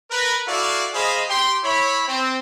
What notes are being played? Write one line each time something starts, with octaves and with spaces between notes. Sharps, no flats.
A#4 B4
E4 F#4 A4 D5 F5
G#3 G#4 C5 D#5 F5 B5
G4 G5 C6
E4 C#5 B5
C4